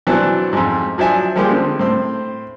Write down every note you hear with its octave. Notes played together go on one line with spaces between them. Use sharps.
B2 E3 F#3 C4 D4
F2 G#2
F3 F#3 D4 E5 G#5
F3 G3 G#3 A#3 G4
D3 C4
A2 C4